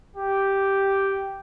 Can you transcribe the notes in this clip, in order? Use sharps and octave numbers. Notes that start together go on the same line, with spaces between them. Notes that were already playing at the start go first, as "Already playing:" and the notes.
G4